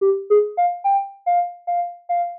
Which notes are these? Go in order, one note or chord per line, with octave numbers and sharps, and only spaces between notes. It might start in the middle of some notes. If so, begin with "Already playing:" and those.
G4
G#4
F5
G5
F5
F5
F5